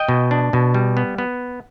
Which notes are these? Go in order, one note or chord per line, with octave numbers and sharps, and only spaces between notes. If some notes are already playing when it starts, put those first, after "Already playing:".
Already playing: D#5 G5
B2
D4
B2
G3
B3
B3